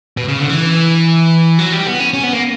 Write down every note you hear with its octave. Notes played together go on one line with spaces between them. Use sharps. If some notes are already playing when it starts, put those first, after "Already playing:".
B2
C#3
D3
E3
F#3
G3
B3
C#4
C#4
B3
A#3